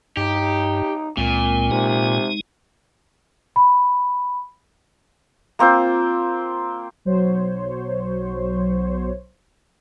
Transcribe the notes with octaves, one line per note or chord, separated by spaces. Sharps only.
G2 D#4 G4
C#2 A#2 G#3 C4
C3 G#3 D#4
B5
A#3 C4 F4 C5
B1 F#3 C5 C#5